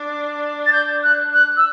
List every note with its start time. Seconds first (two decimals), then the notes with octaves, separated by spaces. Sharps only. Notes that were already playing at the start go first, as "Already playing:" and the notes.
Already playing: D4
0.66 A6
0.73 G6
1.03 F#6
1.33 F#6
1.57 E6